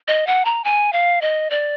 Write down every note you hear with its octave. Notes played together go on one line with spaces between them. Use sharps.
D#5
F#5
A#5
G#5
F5
D#5
D5